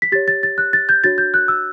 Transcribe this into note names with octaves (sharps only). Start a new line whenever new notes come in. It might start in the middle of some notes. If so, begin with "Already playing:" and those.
B6
G4 C#5 A6
A6
A6
F#6
A6
G6
D4 F#4 C#5 A6
G6
F#6
E6